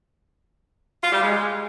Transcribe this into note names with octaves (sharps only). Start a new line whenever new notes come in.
F4
G3
G#3